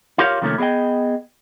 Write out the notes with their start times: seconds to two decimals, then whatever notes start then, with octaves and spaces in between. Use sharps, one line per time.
0.18 E4 F4 G4 A#4 C#5 F5
0.42 C3 D#3 F3 A3 A#3 C#4
0.58 B3 G#4 D5 D#5 G5